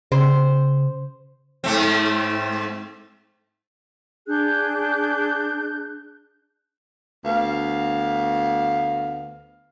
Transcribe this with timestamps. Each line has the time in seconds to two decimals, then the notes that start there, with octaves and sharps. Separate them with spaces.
0.12 C#3 C5
1.64 G#2 A3 C4
4.28 D4 G#4 F#6 G6
7.25 D2 B3 F5